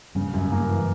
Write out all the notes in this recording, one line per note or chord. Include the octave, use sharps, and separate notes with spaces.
G2 C#3 G3
F#2
A#3
E3